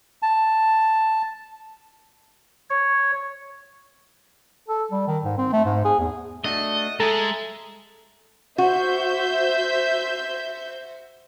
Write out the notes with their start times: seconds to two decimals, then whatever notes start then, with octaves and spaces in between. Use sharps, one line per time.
0.22 A5
2.70 C#5
4.69 A4
4.92 G3
5.08 D#3
5.24 G#2
5.38 C4
5.53 A3
5.65 G#2
5.85 G#4
5.99 E2
6.44 A3 D4 F#4 D#5
7.00 G#3 A4 D#5 E5 G#5 A#5
8.58 F#4 C5 E5 G6